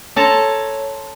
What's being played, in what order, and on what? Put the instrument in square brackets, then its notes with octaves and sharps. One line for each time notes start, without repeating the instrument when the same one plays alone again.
[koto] A4 A5 A#5 [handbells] C#5 C6